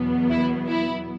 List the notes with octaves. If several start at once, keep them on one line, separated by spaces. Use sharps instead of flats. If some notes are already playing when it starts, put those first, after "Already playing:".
Already playing: E2 B2 F#3 B3
E4
E4